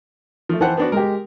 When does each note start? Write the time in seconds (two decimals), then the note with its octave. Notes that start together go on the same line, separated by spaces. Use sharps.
0.49 F3 A3
0.61 E3 C5 F#5 G5 A5
0.77 B3 D4 F#4
0.92 G#3 G4 A#4